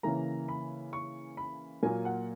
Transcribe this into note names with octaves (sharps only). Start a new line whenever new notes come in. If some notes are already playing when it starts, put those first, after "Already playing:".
C#3 E3 A#3 A#5
B5
C#6
B5
A#2 F#3 A#3 G#5
F#5